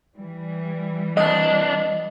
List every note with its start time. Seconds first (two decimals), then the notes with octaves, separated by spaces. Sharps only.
0.18 E3 G3
1.17 C2 D4 D#5